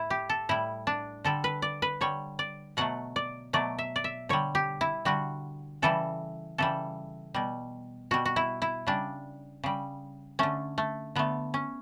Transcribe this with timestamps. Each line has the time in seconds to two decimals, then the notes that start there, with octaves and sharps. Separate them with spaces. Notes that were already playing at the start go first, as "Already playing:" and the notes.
Already playing: A2 E4
0.10 G4
0.29 A4
0.49 A2 G3 E4
0.87 D4
1.24 D3 G3 A4
1.44 B4
1.62 D5
1.82 B4
2.01 D3 G3 C#5
2.39 D5
2.77 B2 F#3 A3 F#5
3.16 D5
3.53 B2 F#3 A3 D5
3.79 E5
3.96 D5
4.04 E5
4.29 D3 G3 C#5
4.55 G4
4.81 E4
5.05 D3 G3 F#4
5.82 C#3 E3 G3 A4
6.58 C#3 E3 G3 A4
7.34 B2 G3
8.11 B2 G3 F#4
8.25 F#4
8.36 E4
8.62 E4
8.87 C#3 G3 D4
9.63 C#3 G3
10.39 D3 A3 C#4
10.78 A3
11.15 D3 A3 B3
11.54 C#4